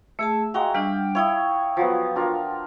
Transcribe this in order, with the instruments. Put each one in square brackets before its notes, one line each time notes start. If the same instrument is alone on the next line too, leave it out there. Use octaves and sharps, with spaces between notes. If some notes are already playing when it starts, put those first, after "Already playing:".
[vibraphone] A3 G#4 A5 [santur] E5
[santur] G#3 F#4 [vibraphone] F5 G5 A#5
[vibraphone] G3 D4 [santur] F5 G5
[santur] E4 C#5 [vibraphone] F5 G5 D#6
[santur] F3 F#3 B3
D4 F4 A#4